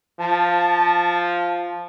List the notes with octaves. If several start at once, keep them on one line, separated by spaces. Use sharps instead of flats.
F3 A5